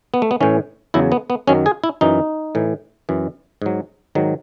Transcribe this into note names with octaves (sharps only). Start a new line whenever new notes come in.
B3
A3
B3
A2 E3 C#4
E2 C#3 F#3 E4
B3
B3
F#2 D#3 F#3 C#4
G#4
E4
F#2 E3 D#4
A2 E3
F#2 E3
G#2 F#3
G#2 D#3 F#3